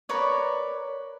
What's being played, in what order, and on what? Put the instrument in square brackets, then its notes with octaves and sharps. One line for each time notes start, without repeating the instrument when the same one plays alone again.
[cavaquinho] A#4 B4 C#5 D5